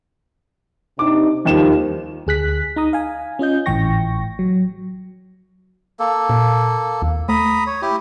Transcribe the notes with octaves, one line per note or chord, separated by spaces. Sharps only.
C3 D4 D#4 D6
D#2 D#3 F3 G3 E7
D2 G#4 F#6 B6
D#4 A#5 D#6
F5 G#5
C#4 F4 D#5 G6
G#1 A2 E3 G5 C#6 A#6
F#3
A#3 A4
A#2
D#2
A3 A#5 B5 D#6
C#5
E4 G4